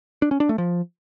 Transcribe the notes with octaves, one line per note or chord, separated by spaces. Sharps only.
D4
C#4
D4
A3
F3